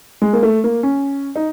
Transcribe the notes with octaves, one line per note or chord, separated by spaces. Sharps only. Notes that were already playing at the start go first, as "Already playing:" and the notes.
G#3
A#3
A3
A#3
C#4
D#4